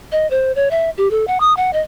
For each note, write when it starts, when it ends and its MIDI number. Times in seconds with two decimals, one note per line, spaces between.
0.12 0.29 75
0.31 0.52 72
0.56 0.69 73
0.71 0.90 76
0.98 1.10 67
1.11 1.25 69
1.28 1.38 78
1.40 1.55 87
1.57 1.71 78
1.73 1.80 75